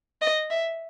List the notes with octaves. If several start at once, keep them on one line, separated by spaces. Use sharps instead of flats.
D#5
E5